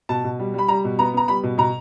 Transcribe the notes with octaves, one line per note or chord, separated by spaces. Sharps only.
B2 A5
B2
G3
G3 B5
G3 A#5
B2
B3 A#5
B3 A#5
G3 B5
B2
B2 A#5